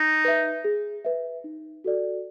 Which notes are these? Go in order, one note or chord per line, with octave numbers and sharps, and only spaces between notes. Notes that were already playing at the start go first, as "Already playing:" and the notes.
Already playing: D#4
B4 E5
G#4
B4 E5
D#4
F#4 A4 D5